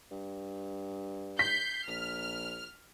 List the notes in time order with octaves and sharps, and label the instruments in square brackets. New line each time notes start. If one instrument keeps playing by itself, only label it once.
[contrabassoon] G2
[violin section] G6 C7 [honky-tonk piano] B6
[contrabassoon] A#1 [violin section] F6